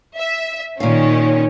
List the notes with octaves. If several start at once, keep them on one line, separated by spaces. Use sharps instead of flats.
E5
A#2 D#3 C#4 F5